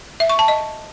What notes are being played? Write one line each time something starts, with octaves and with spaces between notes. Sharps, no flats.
E5
C#6
A5
D#5